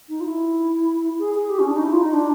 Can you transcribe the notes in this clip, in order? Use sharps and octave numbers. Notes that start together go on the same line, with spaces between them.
D#4
F4
E4
G#4
G#4
G4
C#4
D4
D#4
E4
F4
D#4
D4